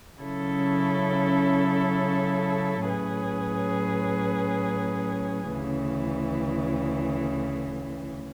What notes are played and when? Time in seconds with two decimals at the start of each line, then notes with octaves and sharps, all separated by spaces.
0.21 C#3 F#3 C#4 E4 A4
2.86 A2 F#3 C#4 G#4 B4
5.51 D2 C#3 E3